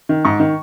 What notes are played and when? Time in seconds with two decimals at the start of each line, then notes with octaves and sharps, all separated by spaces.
0.09 D#3
0.25 G#2 C#6
0.40 D#3